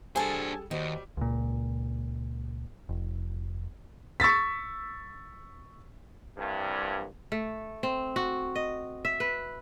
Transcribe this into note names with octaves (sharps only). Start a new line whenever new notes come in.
G3 D4 G#4 A4 C5 G#5 A5
D#2 G3 F#4 C5 D#5
C#2 A#2
F1
C#6 E6 A6 B6
C2 G2
A3
C4
F#4
D#5
E5
B4